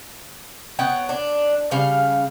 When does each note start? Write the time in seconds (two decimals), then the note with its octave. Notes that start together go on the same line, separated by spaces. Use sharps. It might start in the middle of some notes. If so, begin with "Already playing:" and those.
0.79 B3 C#5 F#5 G5
1.09 D4
1.71 C#3 G3 F5